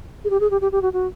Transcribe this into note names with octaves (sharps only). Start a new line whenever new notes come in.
G#4
G4
G#4
G4
G4
G4
F#4
F#4